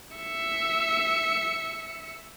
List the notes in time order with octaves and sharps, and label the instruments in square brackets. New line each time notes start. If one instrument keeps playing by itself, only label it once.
[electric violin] E5 C#7